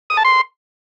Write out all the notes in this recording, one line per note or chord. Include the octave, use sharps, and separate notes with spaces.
D#6
A5
C6